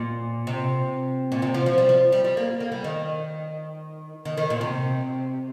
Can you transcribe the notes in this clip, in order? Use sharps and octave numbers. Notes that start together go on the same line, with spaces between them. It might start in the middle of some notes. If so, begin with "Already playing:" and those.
Already playing: A#2
C3
A#2
C3
F3
F3
G3
F3
G3
G3
A#3
A#3
G3
D#3
D#3
D#3
A#2
C3